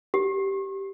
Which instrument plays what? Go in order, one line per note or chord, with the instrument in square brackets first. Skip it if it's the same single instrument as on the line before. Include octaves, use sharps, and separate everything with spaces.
[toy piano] G4